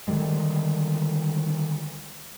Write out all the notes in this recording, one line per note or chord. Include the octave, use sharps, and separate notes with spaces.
D3 D#3 G3 G#3